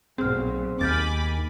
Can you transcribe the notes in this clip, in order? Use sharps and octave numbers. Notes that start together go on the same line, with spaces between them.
B1 A#2 C4 G#4 F6
D#2 G#5 B5 D6 F6 G6 A6